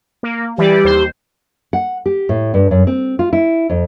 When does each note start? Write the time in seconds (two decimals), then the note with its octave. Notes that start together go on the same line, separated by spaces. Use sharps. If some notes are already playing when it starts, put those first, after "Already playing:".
0.23 A#3
0.58 E3 G3 G4 D5
0.85 D#2 C5
1.73 F#5
2.06 G4
2.29 A2
2.54 G2
2.71 F#2
2.87 C4
3.19 F4
3.33 E4
3.70 F2